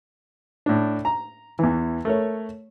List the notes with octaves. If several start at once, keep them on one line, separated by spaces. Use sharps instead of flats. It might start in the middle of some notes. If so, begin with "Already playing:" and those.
A2 D4
A#5
E2 E3
A3 A#4 C#5